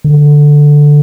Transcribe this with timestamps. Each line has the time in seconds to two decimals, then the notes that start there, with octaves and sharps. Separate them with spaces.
0.04 D3